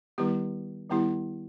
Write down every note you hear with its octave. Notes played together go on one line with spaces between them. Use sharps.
D#3 G3 B3 E4 G4
D#3 G3 B3 E4 G4